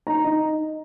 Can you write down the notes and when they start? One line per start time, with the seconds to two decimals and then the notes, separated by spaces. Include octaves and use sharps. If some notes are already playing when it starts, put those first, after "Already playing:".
0.07 D#4 A#5
0.24 D#4